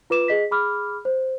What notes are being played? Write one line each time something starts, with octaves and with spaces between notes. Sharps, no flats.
F4 B4 D6 E7
G#4 D#5 B6
G#4 B5 D6 F6
C5